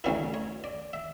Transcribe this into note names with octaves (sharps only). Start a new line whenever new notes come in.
D2 C#3 F#3 C#4 E4 B4
C#5
D5
E5